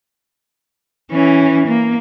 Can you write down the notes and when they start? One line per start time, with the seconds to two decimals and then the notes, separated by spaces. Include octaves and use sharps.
1.11 E3 C#4
1.67 A#3